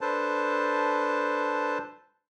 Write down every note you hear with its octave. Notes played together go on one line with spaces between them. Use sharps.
D4 A4 B4 C5 A5